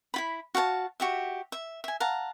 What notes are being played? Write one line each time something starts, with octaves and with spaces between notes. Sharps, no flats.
E4 F4 B5
F#4 F5 F#5 A5
F#4 G4 E5
E5
E5 G#5
F5 F#5 A5 A#5